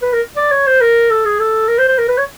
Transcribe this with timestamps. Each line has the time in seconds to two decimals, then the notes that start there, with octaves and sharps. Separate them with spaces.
0.02 B4
0.13 A#4
0.36 D5
0.52 C#5
0.67 C5
0.81 A#4
1.11 A4
1.25 G#4
1.40 A4
1.68 A#4
1.78 C5
1.88 C5
1.98 A#4
2.08 B4
2.18 C#5